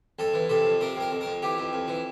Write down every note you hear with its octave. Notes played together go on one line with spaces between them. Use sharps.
F2 A4
E3
C3 A4
F2
C3 A#4
F2 A#4
F2
A#4
F2
E3 G4
F2
F2
E3